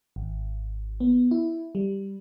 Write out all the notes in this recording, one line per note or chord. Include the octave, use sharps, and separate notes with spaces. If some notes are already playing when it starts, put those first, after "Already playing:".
G#1
B3
E4
G3